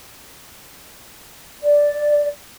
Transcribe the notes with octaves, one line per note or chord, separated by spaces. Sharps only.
D5